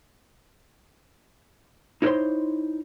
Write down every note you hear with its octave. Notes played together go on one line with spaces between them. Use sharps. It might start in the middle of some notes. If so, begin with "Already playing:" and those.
D#4 E4 A#4 C5 C#5 C6